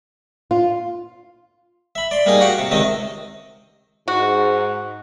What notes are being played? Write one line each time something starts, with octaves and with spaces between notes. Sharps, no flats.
F4
E5 B5
D5 C6
G3 A#3 D#4 G#4
F#4 G4 F5 F#5
C3
C#2 C3 D#3 C4 D#5
G#2 F#4